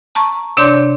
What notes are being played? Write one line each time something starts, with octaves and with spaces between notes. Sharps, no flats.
A5 A#5 C#6
C3 D4 C#5 D5 C6 G6